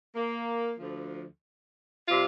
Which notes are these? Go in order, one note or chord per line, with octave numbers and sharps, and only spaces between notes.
A#3
D2 D3 F3
C3 G3 F4